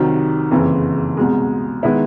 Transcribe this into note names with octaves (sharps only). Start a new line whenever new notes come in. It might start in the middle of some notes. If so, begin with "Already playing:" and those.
Already playing: C2 C3 D#3 F#3
F#1 F2 C#3 E3
C2 B2 G#3
D#3 G#3 B3 E4